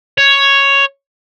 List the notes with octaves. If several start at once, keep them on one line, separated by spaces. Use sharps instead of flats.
C#5